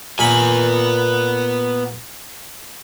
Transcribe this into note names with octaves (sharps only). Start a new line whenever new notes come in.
A#2 B3 G#5 B5